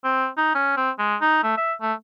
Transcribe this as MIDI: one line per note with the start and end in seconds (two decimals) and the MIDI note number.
0.04 0.27 60
0.37 0.53 63
0.55 0.74 61
0.77 0.90 60
0.99 1.16 56
1.21 1.39 63
1.43 1.56 57
1.58 1.73 76
1.81 1.93 57